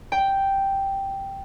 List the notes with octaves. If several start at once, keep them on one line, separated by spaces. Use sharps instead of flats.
G5